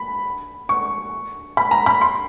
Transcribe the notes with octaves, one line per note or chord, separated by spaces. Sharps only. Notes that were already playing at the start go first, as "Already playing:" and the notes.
Already playing: B5
C#6
B5
A#5
B5
C6